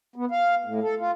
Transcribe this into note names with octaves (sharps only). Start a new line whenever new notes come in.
B3
F5
A2
A4
F4